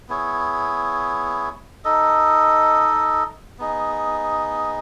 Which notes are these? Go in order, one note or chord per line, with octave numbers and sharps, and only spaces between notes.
B3 E4 G#4 C#5
D#4 A4 D#5
B3 D#4 G#4 D#5